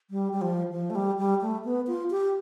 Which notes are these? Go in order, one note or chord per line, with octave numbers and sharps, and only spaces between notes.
G3
G3
F3
F3
A3
G3
G3
A3
B3
F4
G4